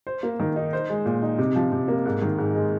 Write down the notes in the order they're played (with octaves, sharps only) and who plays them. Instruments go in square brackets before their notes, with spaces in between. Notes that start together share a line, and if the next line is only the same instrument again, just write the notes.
[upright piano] C5
A#3
D#3
D#4
C5
G#3
A#2
D#4
C3
F3
C3
A#3
G#2
D#3
G#2
G#3